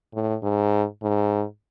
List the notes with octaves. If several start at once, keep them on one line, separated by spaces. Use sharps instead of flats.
A2
G#2
G#2